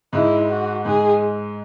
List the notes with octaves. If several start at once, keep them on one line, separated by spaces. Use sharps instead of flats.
G#2 G#3 E4
F#4
G#2 G#3 G#4